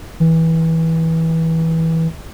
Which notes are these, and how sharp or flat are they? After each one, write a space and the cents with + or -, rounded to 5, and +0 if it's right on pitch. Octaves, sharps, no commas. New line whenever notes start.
E3 -20